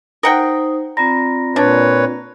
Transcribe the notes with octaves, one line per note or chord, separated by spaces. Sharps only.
D#4 A#4 C5 F#5 G5 D#6
C4 F4 D5 A#5 B5 A#6
A#2 D4 B4 C#5